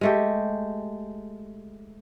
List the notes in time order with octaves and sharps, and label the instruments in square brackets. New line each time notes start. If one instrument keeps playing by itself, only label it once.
[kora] G#3 A3 G4